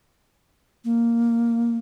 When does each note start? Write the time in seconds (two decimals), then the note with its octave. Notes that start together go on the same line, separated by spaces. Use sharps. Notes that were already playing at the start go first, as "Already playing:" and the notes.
0.84 A#3